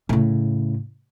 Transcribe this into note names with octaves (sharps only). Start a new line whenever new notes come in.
A2 C#3